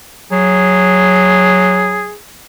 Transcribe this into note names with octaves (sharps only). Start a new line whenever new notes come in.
F#3 G#4